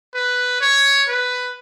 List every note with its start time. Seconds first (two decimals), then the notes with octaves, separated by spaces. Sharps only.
0.15 B4
0.61 C#5
1.08 B4